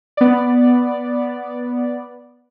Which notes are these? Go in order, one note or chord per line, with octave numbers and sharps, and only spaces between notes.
B3 D5